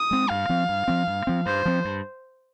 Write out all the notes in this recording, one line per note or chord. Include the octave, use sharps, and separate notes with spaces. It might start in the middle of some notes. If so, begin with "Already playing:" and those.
Already playing: D#6
G#3 C4
G2 F5
F3 C4
G2
F3 C4
G2
F3 C4
G2 C5
F3 C4
G2